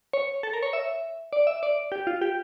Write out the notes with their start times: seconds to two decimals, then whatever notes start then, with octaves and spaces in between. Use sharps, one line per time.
0.13 C#5
0.43 A4
0.53 A#4
0.63 C#5
0.73 E5
1.33 D5
1.47 E5
1.63 D5
1.92 G4
2.07 F4
2.21 G4